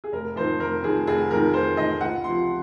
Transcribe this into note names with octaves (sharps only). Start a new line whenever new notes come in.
G#4
F1 A#4
F2 D#3 C5
F1 A#4
F2 D#3 G#4
F1 G#4
F2 D#3 A#4
F1 C5
F2 D#3 D#5
C#2 F#5
C3 F3 C6